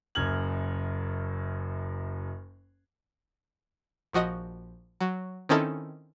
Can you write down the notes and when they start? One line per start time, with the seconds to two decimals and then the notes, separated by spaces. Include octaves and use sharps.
0.15 F#1 F#2 F6 G#6 F#7
4.13 A#1 F3 F#4 D#5 D#6
5.01 F#3
5.49 D#3 C4 C#4 D#4 E4 A4